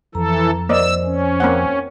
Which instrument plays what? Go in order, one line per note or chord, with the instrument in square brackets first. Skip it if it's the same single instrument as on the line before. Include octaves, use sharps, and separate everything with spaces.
[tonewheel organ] F2 [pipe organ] E3 A4 [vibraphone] A#5
[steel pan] A#3 D5 D#5 [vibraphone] C5 [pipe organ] E6
[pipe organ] C#4
[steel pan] A#3 C4 F#5